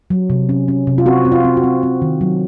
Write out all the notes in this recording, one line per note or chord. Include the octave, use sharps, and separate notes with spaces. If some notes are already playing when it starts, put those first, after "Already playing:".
F#3
C3
C#4
C#4
C3
F4
C4 F#4
C4
F4
C4
F#4
C4
C4
D#3
F#3